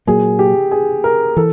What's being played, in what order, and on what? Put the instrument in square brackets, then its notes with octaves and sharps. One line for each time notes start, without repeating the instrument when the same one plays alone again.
[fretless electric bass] A#2 F#3 A#3 [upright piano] G#4
[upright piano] G4
G#4
A#4
[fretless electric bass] E3 [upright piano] A4